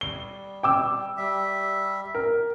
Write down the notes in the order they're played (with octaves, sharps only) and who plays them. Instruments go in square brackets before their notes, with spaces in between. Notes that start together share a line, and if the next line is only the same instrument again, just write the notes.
[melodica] G3 [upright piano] G7
[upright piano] G5 D6 E6
[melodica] G3 E5
[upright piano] A#4